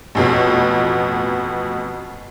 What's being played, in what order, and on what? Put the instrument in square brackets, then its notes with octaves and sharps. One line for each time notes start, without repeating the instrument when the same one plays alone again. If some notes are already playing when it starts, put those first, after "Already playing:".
[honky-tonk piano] A1 F2 B2